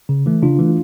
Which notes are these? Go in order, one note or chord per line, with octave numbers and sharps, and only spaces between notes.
C#3
E3 A3
C#3 D4 F4
E3 A3